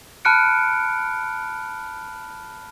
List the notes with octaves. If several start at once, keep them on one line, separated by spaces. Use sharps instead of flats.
A5 B5 F6 F#6 C#7 D7